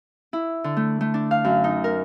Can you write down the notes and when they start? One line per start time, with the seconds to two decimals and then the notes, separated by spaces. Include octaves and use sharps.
0.33 E4
0.64 D3
0.77 A3
1.01 A3
1.14 D4
1.31 F5
1.44 F#2
1.64 D#4
1.84 A#4